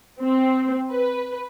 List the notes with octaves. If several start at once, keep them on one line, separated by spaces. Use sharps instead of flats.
C4
B4